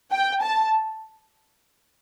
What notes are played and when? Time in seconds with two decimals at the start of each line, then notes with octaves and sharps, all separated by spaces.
0.11 G5
0.41 A5